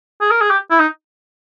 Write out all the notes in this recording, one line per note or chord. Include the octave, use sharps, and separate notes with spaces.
G#4
A#4
G#4
G4
E4
D#4